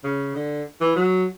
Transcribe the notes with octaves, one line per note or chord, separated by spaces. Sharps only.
C#3
D3
E3
F#3